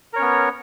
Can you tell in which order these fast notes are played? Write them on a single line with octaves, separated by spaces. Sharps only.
A#4 C#5 C#4 B3